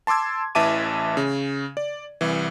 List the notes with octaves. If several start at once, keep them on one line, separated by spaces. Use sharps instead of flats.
A5 C6 D6 E6 G#6
A1 E3 E5 A5 D6 D#7
C#3
D5
C2 E3